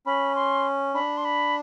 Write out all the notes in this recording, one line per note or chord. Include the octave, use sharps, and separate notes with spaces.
C#4 B5
C6
D4 B5
C6
B5